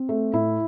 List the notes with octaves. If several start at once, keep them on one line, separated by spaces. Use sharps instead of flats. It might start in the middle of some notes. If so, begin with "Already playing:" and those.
Already playing: C4
A3
A2 E4